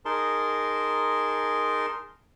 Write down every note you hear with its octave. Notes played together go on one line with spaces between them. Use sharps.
D#4 G#4 A#4 A5 C6